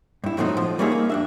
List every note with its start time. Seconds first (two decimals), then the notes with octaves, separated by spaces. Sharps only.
0.24 G2 E4
0.37 A2 F3 F#3 A3 C4 D#4
0.57 F3
0.79 G3 A#3 C#4 D#4 G#4 E5
0.92 A#3
1.10 F2 D4 E5